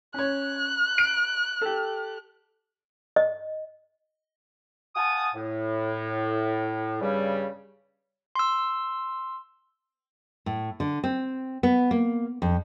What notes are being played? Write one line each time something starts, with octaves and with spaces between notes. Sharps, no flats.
C#4 C#5 F#6
D7
G4 A4
D#5
F5 F#5 G#5 A5 D#6
A2
G2 C#3 G3
C6 E6
A2
D3
C4
B3
A#3
F2